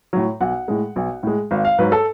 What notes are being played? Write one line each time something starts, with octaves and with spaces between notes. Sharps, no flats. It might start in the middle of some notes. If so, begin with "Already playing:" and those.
A2 F#3
B1 F#5
A2 G#3
B1
A2 G#3
G#1 F5
F5
G#2 F#3 B4
A4